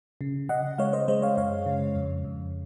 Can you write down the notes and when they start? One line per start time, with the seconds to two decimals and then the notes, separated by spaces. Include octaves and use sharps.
0.21 C#3
0.49 C#3 D#5 F#5
0.78 G#3 C#5 F5
0.93 C5 D#5
1.08 G#3 C5 D#5
1.22 C#5 F5
1.37 F#2 C#5 F5
1.66 C#3
1.96 F2
2.25 F2